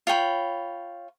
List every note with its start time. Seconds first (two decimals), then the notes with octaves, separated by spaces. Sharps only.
0.07 F4 C#5 G5 B5